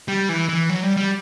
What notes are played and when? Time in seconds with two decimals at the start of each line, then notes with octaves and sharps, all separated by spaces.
0.08 G3
0.29 E3
0.49 E3
0.69 F#3
0.83 G3
0.97 G3